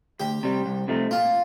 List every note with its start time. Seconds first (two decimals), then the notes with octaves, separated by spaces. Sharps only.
0.20 D2 G4
0.43 C3 G3
0.66 C2
0.88 C3 F3 A3 D#4
1.11 A#2 F4